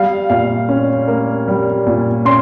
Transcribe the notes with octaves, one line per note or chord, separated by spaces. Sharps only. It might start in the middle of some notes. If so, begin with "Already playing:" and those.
Already playing: G3 F5
A#2 F5
C#4
A#3
G3
A#2
C#4 C6